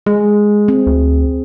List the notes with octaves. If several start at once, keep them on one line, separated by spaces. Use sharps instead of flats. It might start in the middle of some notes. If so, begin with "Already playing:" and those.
G#3 G#4
C4
D2